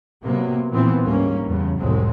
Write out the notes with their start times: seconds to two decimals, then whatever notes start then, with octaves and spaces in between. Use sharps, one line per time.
0.24 C3 F#3 A#3 B3
0.71 A#2 E3 F3 B3 C4
1.02 D2 G#2 G3 A#3 C#4
1.43 E2 G2 C#3
1.75 C2 F2 A2 F#3 G#3 C4